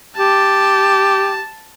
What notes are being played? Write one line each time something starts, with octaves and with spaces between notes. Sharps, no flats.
G4 A5